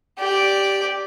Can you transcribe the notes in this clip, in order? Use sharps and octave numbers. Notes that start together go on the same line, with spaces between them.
G4 D5